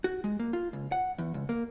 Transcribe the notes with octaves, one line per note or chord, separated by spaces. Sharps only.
F#4
G#3
A#3
F4
C#2
F#5
E2
C#2
A#3